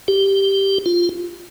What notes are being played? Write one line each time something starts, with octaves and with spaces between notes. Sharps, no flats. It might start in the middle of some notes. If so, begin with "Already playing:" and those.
G4
F4